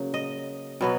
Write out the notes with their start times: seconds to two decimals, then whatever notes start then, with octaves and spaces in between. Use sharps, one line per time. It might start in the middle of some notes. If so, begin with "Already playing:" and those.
Already playing: C#3 F#3 A#3
0.14 D#5
0.81 B2 F#3 B3